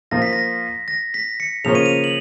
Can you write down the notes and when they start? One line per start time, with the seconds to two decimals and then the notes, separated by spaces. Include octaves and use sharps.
0.11 F3 A#3 F4 A#6
0.22 B6
0.33 A#6
0.88 A#6
1.14 B6
1.40 C#7
1.64 C#3 F3 A#3 C#4 F7
1.75 D#7
1.86 F7
2.04 F#7